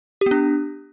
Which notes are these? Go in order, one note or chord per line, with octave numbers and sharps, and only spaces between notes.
B3 D4 G4